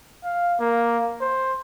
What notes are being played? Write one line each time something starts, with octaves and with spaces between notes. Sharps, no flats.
F5
A#3
C5